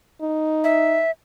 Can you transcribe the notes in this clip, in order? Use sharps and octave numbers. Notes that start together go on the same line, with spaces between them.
D#4
E5